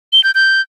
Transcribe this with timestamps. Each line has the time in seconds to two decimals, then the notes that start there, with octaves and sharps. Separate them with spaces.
0.13 G7
0.24 G6
0.35 G6